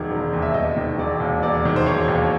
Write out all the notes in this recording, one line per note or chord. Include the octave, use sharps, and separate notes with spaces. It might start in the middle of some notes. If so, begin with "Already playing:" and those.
Already playing: E1 D#3
E1
D#2
E5
E1 D#5
D#3
E1 D5
D#2
E1 D5
D#3
C5
E1 C#5
D#2